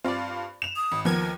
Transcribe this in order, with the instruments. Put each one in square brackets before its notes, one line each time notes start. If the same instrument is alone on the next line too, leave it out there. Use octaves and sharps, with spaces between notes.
[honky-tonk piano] G2 F4 [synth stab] C4 D5
[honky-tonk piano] E7 F7
[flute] D#6
[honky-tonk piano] G#1
[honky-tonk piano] D#2 [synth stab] F3 B3 G#6 [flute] A#4